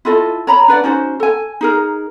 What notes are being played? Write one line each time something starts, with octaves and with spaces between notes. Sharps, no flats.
E4 F4 A4 D#5
C#5 A#5 B5
D4 B4 D5 F#5
C#4 D#4 F#4 C5
A4 G#5
D#4 G#4 A#4